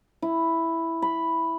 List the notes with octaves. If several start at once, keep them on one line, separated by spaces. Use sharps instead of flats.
E4
B5